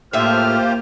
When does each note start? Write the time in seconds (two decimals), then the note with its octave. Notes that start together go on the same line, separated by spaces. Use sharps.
0.13 A2 A#3 F4 G4 C5 E5 F6